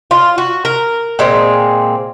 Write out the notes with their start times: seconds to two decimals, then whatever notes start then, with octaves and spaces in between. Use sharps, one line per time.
0.11 F4
0.38 F#4
0.65 A#4
1.19 A#2 G#3 C4